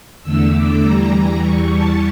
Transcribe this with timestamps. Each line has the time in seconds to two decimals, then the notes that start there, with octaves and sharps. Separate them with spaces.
0.22 E2 D3 A3 E6
0.53 D6
0.82 E2 E3 G3 A#5
1.41 E2 E3 G3 C#6
1.71 A5